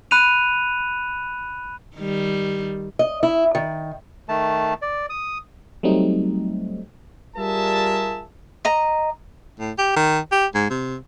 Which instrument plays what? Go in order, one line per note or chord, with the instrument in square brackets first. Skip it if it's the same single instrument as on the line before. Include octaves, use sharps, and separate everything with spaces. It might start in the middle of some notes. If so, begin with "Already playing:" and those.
[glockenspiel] B5 F#6 C#7 D#7 F7
[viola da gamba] D#3 G3
[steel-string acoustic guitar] D#5
E4
D#3
[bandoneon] D#3 A3 A5
D5
D#6
[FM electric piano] F#3 G3 A3 C4 D#4
[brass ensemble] G3 F4 G#4 A#4 E5 A5
[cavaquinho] D#5 A#5
[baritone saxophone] A2
G4
D#3
G4
G#2
C3